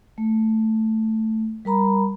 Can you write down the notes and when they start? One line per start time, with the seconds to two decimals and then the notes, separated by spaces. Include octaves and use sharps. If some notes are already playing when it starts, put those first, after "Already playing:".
0.18 A3
1.65 G3 A#4 A#5 B5